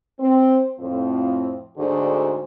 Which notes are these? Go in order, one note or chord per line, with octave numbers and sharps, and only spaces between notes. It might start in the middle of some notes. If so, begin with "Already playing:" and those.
C4
F2 A2 F3 C4
D2 G#2 D3 F#4 G#4 C5